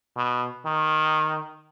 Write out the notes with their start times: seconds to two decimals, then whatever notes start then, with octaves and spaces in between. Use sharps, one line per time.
0.17 B2
0.66 D#3